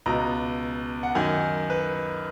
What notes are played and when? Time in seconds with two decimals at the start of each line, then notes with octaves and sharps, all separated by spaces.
0.06 C#2 B2 A#5
1.03 F#5
1.15 F#2 D#3 G#5
1.70 B4